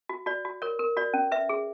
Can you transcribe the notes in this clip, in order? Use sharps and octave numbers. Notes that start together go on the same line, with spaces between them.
F#4
F#4 D5
F#4
A#4 C#5
A#4
F#4 D5
C#4
B4 E5
G#4